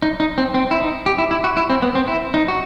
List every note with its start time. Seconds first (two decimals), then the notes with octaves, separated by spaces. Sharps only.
0.02 D#4
0.20 D#4
0.38 C4
0.54 C4
0.71 E4
0.80 D#4
1.06 G4
1.18 E4
1.31 E4
1.44 F#4
1.57 E4
1.70 C4
1.82 B3
1.95 C4
2.08 E4
2.34 D#4
2.48 F#4